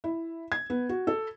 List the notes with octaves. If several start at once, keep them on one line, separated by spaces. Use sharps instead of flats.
E4
G#6
B3
F#4
A4